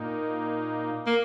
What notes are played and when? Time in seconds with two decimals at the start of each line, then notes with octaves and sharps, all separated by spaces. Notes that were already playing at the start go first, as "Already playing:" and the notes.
Already playing: A#2 A#3 D#4
1.07 A#3